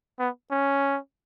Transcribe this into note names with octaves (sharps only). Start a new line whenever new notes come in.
B3
C#4